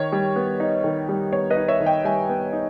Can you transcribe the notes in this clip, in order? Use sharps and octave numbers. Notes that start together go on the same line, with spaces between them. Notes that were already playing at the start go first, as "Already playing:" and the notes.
Already playing: D#3 C#5
G3
B3
D#4
D#3
G3
B3 C#5
B4 D#5
D#4
C#5 E5
D#3
D#5 G5
G3 E5 G#5
B3
D#4